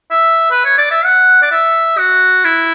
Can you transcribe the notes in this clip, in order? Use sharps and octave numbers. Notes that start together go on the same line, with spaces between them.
E5
B4
C#5
D5
E5
F#5
D5
E5
F#4
E4